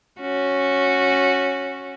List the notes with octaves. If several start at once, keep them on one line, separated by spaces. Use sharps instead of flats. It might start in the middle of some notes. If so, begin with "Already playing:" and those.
C#4 F#4